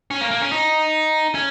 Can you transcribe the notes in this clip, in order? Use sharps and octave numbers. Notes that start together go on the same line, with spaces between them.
C#4
A#3
A#3
C#4
D#4
C#4